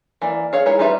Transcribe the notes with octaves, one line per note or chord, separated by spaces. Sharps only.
E3 A#3 D5
G#4 C#5 F5
G#3 D#4 E4 G#4 C#5
G3 D#4 F4 B4 E5